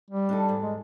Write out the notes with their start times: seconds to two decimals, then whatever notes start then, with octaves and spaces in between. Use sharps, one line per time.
0.10 G3
0.29 D4 D#4 A4
0.49 E2 G#2
0.63 G#3